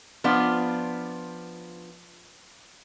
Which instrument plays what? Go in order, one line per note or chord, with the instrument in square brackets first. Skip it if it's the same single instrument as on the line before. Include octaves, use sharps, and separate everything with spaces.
[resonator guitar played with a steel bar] F3 B3 D4 F4